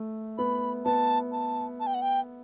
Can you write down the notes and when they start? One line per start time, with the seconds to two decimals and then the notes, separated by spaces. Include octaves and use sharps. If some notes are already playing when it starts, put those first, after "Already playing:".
Already playing: A3
0.38 B3 B5
0.85 B3 A5
1.32 A5
1.80 A5
1.87 G5
1.94 F#5
2.02 G5